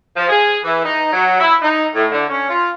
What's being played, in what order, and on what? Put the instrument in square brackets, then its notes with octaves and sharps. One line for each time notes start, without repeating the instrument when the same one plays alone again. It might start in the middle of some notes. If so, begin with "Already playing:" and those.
[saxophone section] F3
G#4
E3
D#4
F#3
E4
D#4
A2
D3
C#4
F4